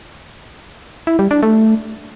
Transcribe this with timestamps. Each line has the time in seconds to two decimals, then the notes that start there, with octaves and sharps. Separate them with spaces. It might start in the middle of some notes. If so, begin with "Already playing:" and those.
1.07 E4
1.19 G3
1.31 D4
1.43 A3